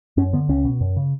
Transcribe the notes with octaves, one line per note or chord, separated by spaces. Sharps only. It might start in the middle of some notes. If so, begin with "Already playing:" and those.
F#2 C#4
D3 B3
C#2 C#4
B2
F#2
C#3